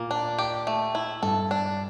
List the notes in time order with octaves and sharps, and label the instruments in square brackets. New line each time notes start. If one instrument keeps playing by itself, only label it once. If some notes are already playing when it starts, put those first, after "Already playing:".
Already playing: [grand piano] A#2 [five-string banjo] A#3
[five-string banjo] D4
G4
A3
E4
[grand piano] G2 [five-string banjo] A4
[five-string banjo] D4